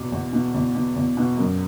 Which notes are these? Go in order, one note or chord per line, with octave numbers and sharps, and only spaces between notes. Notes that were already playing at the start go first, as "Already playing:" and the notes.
Already playing: E2 B2
E2
B2
E2
B2
E2
B2
F#2